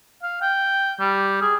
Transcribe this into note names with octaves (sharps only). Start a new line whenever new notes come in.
F5
G5
G3
G#4